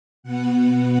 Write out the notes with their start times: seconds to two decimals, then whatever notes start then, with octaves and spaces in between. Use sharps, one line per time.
0.23 B2 B3 F#5
0.55 F#5